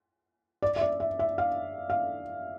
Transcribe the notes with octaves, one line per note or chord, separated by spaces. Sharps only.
D5
E5
D5
E5
E5
F5
F5